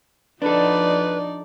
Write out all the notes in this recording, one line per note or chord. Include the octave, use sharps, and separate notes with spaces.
F3 D4 D#4 A4 B4 D5